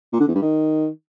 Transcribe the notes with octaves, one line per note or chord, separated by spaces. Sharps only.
A#2
D3
E2
G2
D#3